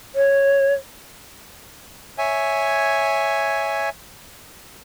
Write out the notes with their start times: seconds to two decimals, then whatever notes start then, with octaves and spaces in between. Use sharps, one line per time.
0.15 C#5
2.18 C#5 E5 G#5